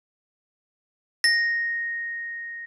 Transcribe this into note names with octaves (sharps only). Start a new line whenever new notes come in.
A#6